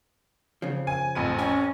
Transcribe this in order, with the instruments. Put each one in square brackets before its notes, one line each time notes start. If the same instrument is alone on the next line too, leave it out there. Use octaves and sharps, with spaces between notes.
[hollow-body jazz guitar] C#3 F3
[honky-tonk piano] G#5
A1 F2 D#7
[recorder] C#4 [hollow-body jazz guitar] G#5